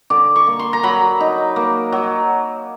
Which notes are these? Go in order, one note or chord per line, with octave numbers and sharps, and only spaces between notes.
D3 D6
C#6
A#3
C6
A#5
F#3 B5
D#4
A#3
F#3